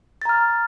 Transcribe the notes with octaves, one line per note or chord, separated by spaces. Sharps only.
A#5 F6 A6